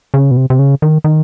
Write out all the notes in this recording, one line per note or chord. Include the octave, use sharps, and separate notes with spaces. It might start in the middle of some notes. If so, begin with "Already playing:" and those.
C#3
B2
C3
C3
C#3
D#3
D#3